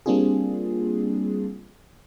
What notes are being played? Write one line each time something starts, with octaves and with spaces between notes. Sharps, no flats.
G3 A#3 C4 D4 F4 G#4